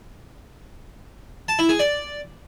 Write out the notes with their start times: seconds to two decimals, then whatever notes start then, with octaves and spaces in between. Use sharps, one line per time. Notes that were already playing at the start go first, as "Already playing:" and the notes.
1.48 A5
1.59 E4
1.69 G#4
1.79 D5